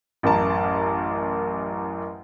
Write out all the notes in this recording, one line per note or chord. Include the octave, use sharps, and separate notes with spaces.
A1 F#2 A#4 A5 A#5